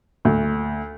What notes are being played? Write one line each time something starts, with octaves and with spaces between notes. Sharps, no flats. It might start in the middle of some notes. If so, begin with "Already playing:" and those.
D2